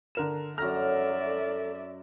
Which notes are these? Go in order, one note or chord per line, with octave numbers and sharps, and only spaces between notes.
D3 A#4 E7
F#2 A4 D5 E5 A#5 F6
A4